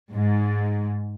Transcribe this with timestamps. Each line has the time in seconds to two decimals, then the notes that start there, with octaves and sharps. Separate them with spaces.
0.12 G#2